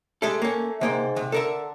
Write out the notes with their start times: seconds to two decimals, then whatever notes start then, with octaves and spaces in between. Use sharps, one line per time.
0.22 G#3 A3 G4 A4
0.42 A#3 C#4
0.81 G#2 C3 A#3 G5
1.16 C3
1.32 D3 A4 A#4 E5